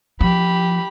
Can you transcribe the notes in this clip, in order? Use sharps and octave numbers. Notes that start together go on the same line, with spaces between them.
F3 G4 B5